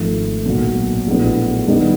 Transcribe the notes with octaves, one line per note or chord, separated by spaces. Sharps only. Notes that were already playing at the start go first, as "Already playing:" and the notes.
Already playing: G#1 G#2 F3 A3
B1 A#2 F#3
A#1 A2 F#3 B3 D4
D#3 G3 B3 D#4